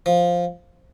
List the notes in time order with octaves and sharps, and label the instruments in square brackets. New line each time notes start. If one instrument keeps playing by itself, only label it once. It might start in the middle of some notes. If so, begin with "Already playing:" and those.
[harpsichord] F3